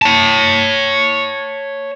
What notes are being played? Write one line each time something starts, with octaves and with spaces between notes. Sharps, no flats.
C#5 A5